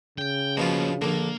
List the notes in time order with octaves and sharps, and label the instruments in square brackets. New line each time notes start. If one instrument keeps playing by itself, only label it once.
[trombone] C#3 [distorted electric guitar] G5
[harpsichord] B2 F3 F4 [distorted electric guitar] A#3 C#4
[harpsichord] A#1 D3 [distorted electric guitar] A#3